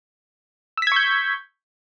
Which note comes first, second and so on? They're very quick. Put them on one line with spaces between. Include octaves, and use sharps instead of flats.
E6 B6 G#6 C#6 G6